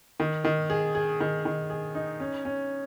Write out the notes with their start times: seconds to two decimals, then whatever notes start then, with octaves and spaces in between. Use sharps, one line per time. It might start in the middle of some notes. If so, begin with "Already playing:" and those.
0.20 D#3
0.45 D#3
0.70 G#4
0.95 G#4
1.20 D#3
1.45 D#3
1.70 G#4
1.95 D#4
2.20 C#4
2.45 C#4